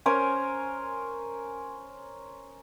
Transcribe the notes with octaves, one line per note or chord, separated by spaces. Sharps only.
C#4 A#4 C5 G#5